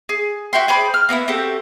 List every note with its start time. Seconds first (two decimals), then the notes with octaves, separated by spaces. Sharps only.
0.09 G#4
0.53 F#4 E5 G5 C6
0.68 G#4 C5 D5 B5
0.94 F6
1.09 A#3 B3 D4 E4
1.28 C4 F#4 G4 A4